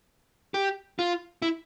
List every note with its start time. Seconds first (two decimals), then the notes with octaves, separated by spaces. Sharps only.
0.54 G4
0.99 F4
1.42 E4